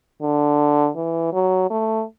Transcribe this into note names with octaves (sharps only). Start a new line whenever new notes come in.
D3
E3
F#3
A3